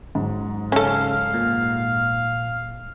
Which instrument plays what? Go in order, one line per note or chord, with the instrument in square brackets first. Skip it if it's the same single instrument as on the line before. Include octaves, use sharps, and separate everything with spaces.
[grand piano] G#2 F#3
[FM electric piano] C#3 [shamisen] C#4 A4 [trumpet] F5
[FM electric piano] A#2